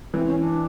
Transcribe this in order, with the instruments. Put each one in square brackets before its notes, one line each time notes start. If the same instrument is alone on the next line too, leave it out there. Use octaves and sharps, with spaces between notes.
[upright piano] E3 [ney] C4
[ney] C#4
D4